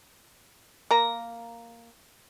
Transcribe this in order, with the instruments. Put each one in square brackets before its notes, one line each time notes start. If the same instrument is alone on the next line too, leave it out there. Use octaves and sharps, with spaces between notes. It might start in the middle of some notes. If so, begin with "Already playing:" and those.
[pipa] A#3 A#5